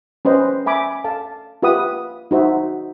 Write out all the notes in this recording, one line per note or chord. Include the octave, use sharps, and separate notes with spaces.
C#4 B4 C5 D#5
E5 G#5 B5 D6
A4 F5 A5
F4 G4 B4 E5 F#5 D#6
D#4 F#4 C5 E5